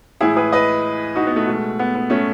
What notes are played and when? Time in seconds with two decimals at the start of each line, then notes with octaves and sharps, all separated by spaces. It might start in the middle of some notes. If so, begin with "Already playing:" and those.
0.21 A2 E3 G#3 E4 G#4
0.36 G#4 B4
0.52 B4 D#5
1.15 D#4 F#4
1.27 B3
1.36 A3
1.47 B2 G#3
1.79 B3
1.95 B3
2.10 A3 C#4